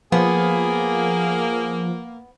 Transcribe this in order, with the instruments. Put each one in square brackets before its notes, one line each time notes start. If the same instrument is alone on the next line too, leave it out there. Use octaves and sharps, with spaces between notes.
[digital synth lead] F3 [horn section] A#3 [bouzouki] B3 [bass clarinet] G#4